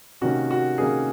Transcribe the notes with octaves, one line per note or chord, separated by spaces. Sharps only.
C3 D#3 A#3 C#4 F#4
F#4
C3 D#3 A#3 C#4 G#4